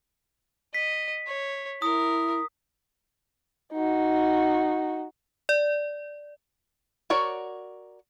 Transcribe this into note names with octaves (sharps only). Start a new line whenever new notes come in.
D#5 B6
C#5
E4 A#4 D#6
D#4 F#4
D5
F#4 A#4 C#5 D5